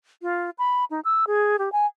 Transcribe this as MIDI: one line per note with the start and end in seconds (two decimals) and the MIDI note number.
0.22 0.50 65
0.58 0.85 83
0.91 1.00 63
1.05 1.25 88
1.27 1.57 68
1.59 1.72 67
1.72 1.86 80